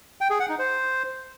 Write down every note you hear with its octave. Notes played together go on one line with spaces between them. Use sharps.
G5
G#4
F#5
D#4
C5